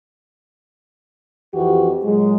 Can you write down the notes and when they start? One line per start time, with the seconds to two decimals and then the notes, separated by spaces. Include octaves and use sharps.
1.52 F2 E3 F#4 G4
2.04 A#2 F#3 G#3